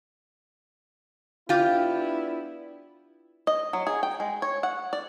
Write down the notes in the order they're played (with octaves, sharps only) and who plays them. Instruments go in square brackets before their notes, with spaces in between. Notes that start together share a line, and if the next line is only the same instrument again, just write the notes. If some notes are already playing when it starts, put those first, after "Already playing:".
[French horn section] B3 D4 E4 [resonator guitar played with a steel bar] F4 G4
[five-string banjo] D#5
F#3
G#4
G5
G#3
C#5
F#5
D5